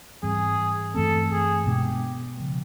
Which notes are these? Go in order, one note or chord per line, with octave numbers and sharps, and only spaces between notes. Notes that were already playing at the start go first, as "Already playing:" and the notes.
G#2 E3 G3 C4 G#4
G2 E3 A3 C4 A4
G#4
B2 G#3 B3 D4 G4
C#3 F3